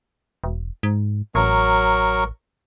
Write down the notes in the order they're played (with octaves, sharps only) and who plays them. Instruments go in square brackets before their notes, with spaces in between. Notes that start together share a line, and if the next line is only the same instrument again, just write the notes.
[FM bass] E1
G#2
[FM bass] A1 [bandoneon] F#3 A#4 C#6